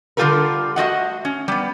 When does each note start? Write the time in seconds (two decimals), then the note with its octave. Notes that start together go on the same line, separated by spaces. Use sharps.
0.17 D3 G3 F4 G4 A4 A#4
0.76 A3 F#4 D#5 F#5
1.25 C#4
1.48 G3 B3